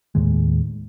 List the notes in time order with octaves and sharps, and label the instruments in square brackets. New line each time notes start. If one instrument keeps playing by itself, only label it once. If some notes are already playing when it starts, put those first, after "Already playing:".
[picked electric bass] D#2 A2 D#3 G#3